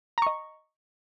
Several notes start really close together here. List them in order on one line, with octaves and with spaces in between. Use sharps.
A#5 C#6 D#5